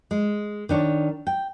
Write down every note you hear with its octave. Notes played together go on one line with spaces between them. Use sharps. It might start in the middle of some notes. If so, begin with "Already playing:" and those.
G#3
D#3 D4 C#5
G5